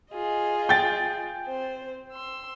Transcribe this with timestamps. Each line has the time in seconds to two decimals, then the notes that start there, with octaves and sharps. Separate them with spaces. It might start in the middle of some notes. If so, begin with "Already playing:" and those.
0.12 F4 G#4 D#5
0.69 G5 A6
1.47 C4 C5
2.13 C6 E6